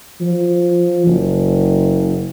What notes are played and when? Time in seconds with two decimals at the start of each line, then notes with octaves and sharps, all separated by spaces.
0.21 F3
1.07 F#1